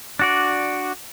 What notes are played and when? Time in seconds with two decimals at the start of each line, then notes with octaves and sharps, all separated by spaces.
0.19 D4 F#4 D5